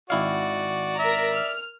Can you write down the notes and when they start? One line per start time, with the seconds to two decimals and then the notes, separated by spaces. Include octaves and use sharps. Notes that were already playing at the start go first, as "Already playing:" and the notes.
0.10 G#1 E4 F#4 D5 F5
0.99 A#4 D5 E5 A#5
1.34 F6